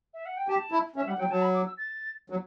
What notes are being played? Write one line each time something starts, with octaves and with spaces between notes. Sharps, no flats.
E5
F#5
G5
G4 A5
E4
C#4 E5
G3 F#5
F#3 G5
F#3 A5
B5
D6
E6
A6
F#3